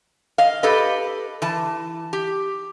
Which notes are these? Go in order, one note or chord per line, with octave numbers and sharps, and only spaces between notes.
D#5 F5
G4 A4 B4 D#5
E3 A5
G4